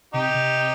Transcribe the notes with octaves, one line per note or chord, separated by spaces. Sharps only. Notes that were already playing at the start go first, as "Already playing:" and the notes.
C3 D#4 G4
C3